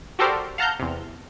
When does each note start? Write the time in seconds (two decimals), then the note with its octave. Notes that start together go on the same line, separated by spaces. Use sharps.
0.19 F#4 G4 A4 A#4 C5 D5
0.58 F5 F#5 A5 A#5 F6 G6
0.79 E2 C3